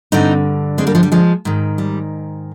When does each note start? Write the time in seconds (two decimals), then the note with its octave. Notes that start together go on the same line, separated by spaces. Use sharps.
0.12 G2 D3 C4 D#4
0.78 G#3 C4
0.87 G3 A#3
0.95 F3 G#3
1.03 G3
1.12 F3 G#3
1.45 G#2 D#3
1.78 G3